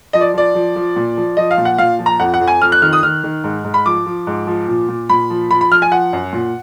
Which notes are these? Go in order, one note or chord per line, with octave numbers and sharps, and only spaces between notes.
F3 D#5
D5
F3 D5
F3
F3
A#2
F3
F3 D#5
F5
A#2
F#5
A#2 F5
F3
A#5
F2 F#5
F#5
F2
G#5
F2 F6
F#6
D#3 F6
D#6
D#3 F6
D#3
G#2
G#2
B5
F3 D6
F3
G#2
F3
A#2
A#2
A#2 B5
F3
F3 B5
B5
F3 F6
G#5
F3 F#5
F#2
A#2